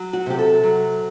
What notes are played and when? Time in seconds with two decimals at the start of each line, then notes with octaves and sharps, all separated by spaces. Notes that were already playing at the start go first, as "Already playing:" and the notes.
Already playing: F#3
0.13 F#4
0.26 C3 G4
0.38 A4
0.63 F#3